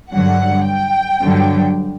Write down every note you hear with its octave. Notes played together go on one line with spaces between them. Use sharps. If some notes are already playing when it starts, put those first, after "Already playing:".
G2 D3 F#3 F#5
G5
G2 D3 F#3